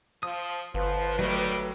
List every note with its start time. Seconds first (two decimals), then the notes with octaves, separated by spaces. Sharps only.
0.23 F3 D#6
0.74 G1 F3 B4
1.19 D#3 F#3 G3 A3